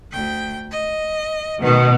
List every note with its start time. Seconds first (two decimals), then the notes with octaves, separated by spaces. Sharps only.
0.12 D2 G5
0.71 D#5
1.62 B2 D#3 A3